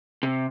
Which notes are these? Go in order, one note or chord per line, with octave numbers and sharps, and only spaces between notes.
C3